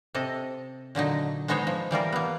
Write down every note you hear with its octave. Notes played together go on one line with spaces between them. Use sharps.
C3 A4 D#5
A#2 D3 F#3 D#4
G#3 B3 D#4 C5 C#5
F3
E3 G3 F4 A#4
A#3 B3